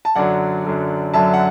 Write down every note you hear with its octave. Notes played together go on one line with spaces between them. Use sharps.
A5
F#2 D3 F#3 D5 F#5
F#2 D3 F#3
F#2 D3 F#3 E5 A5
F#5